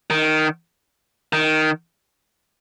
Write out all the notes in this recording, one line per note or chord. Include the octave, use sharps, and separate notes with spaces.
D#3
D#3